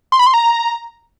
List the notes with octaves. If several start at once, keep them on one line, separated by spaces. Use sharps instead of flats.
C6
B5
C6
A#5